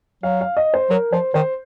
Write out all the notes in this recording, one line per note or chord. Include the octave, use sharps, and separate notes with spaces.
F#3 F5
F5
D#5
C5
F#3 A#4
F3 C5
D#3 C5